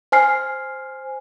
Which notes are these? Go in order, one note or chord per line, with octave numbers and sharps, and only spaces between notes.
C5 G#5 F6 C7